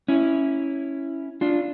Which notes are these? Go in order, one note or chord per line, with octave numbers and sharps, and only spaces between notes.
C#4 E4
D4 F4